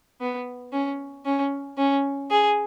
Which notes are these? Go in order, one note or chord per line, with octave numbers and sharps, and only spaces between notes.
B3
C#4
C#4
C#4
G#4